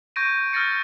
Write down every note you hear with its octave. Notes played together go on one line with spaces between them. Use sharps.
C#6 G6 G#6 A#6 D7 D#7
E6 F6 G6 A6 A#6 C#7